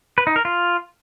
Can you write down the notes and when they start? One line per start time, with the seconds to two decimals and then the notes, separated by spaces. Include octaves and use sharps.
0.18 B4
0.27 D#4
0.36 A#4
0.45 F4